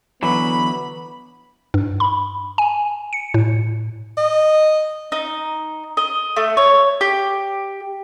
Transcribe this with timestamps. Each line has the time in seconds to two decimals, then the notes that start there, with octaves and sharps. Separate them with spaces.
0.23 D3 E3 F#3 B3 B5
1.74 G2
2.00 B5
2.58 G#5
3.13 C#7
3.34 A2
4.18 D#5
5.12 D#4
5.97 D#5
6.36 A3
6.57 C#5
7.01 G4